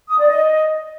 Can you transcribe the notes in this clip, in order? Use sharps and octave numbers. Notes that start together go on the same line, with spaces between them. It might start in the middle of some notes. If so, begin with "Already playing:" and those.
D#6
D5
D#5